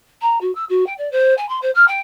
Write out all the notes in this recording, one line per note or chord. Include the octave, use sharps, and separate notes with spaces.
A#5
F#4
E6
F#4
G5
D5
C5
G#5
C6
C5
F6
G5